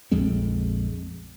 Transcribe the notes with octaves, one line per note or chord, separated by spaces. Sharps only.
A#1 F2 G#3 C4